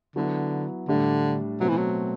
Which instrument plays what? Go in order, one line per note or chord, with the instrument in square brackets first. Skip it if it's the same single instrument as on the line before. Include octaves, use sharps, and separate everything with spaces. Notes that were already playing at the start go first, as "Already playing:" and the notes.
[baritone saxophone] D3 [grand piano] F#3 B3 E4
[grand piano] A2 G3 D4 [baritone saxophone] D3
[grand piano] B2 A3 C4 [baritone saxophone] F#3
[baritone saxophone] E3
F#3